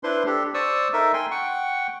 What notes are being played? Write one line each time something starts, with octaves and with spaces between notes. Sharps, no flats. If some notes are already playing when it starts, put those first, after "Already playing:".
D4 E4 B4 C5 C6
D4 G4 A4
C5 D5 C#6 D#6 E6
D#4 A4 A#4 E5
G5 G#5 C6
F#5 G5 C#6